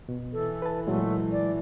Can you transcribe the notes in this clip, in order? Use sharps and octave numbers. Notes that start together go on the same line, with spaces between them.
B2
E3 A4
B4 A5
A#2 F#3 G#3 A3
D5